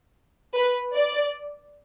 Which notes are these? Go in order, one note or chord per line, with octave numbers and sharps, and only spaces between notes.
B4
D5